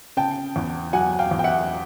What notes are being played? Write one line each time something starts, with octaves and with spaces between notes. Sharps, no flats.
C#3 G5 A5
E2
F#3 F#5 G#5
F5 G5
E2
G5
E5 F#5